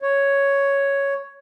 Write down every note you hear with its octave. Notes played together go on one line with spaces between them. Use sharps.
C#5